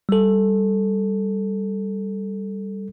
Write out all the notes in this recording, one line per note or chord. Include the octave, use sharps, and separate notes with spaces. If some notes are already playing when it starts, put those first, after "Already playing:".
G3 A4